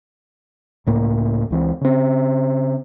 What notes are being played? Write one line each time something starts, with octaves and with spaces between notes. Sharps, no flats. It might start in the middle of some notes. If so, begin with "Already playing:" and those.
C#2 A2 A#3
C#2 E3 C4
C#3 C4